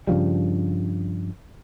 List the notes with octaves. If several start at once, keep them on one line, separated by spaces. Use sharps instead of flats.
G2 C#3 F3 G3